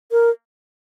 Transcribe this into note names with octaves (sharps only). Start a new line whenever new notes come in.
A#4